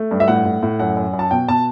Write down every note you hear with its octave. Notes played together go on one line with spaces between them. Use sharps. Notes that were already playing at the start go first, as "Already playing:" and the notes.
Already playing: A3
G2
E5
A2 F#5
A2
A2
F#2 F#5
F#2
F#2
A5
B2 G5
B2 A5